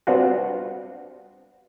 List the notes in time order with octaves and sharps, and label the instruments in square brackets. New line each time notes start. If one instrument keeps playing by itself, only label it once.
[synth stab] G3 B3 C4 D4 F4 F#4